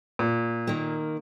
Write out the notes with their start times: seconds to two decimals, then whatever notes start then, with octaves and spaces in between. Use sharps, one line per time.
0.19 A#2
0.67 D#3 A#3